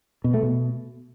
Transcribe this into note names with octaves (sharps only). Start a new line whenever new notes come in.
B2
A3
B2